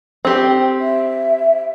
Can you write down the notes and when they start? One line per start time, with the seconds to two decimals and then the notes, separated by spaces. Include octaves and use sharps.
0.25 C4 G4
0.80 E5